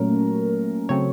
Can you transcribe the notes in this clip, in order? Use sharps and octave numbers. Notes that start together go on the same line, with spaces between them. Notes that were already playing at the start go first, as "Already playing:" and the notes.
Already playing: A#2 F#3 A3 C#4 A#4
C#3 F#3 A3 C4 C#5